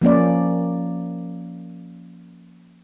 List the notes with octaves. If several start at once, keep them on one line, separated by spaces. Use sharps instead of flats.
F3 A#3 C#4 D5